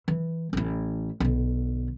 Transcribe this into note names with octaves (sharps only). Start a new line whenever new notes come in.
E3
A1 E4
B1 D3